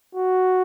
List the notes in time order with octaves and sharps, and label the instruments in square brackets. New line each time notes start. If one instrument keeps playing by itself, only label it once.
[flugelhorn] F#4